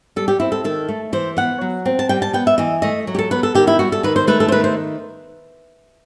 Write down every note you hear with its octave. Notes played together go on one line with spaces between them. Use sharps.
G3 A4
G4
C4 E4
A4
D#3 A4
A3
E3 C5
B3 F#5
F#3
C4
A5
G3 G5
A5
B3 G5
E5
E3 D#5
A3 D#5
F#3
G4
A4
B3 B4
A4
D#3 G4
E4
G3 F#4
A4
D#3 B4
C5
A3 B4
A4
C5
D#3 B4
C5